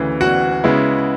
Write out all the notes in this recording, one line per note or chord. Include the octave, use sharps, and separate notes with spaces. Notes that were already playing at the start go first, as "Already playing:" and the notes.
Already playing: D2 C#3 E3
F#4 F#5
C#3 G#3 B3 E4